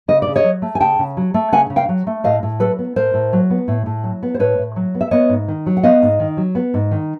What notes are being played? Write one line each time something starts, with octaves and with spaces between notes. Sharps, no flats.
C#3 D#5
D5
C#3
C#5 D#5
F#3
A3
G#5
C#3 G5 A5
C#3
F#3
A3
C#3 F#5 G#5
C#3
F5 G5
F#3
A3
A2 D#5 F5
A2
F#3 A4 B4
B3
A2 A#4 C5
A2
F#3
B3
A2
A2
F#3
B3
C5
A2 B4 C#5
A2
F#3
B3
E5
B3 C#5 D#5
G#2
D#3
F#3
F#5
B3 D#5 F5
G#2
D#3
F#3
B3
G#2
D#3